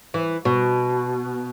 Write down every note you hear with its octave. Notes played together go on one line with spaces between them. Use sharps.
E3
B2